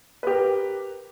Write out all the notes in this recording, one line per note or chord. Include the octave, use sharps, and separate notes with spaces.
G4 A#4 B4